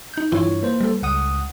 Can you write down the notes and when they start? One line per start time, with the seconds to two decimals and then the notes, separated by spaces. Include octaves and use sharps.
0.14 D#4 G6
0.32 G2 E3 E4 F4 C#5
0.63 A#3 B4 C5
0.81 G3 A4
1.03 C#2 F#5 D#6